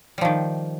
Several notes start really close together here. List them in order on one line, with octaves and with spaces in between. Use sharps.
G3 F3 D#3